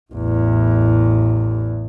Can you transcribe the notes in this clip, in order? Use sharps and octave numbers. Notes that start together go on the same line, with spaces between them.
A1 E2